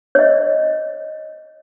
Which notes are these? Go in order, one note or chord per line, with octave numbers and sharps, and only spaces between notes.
C#5 D#5